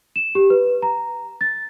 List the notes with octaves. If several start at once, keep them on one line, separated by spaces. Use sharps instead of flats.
E7
G4
B4
A#5
A6